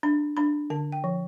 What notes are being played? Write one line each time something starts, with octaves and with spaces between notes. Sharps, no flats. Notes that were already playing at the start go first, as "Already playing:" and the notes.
D4 B5
D4 B5
D3 A5
G5
F3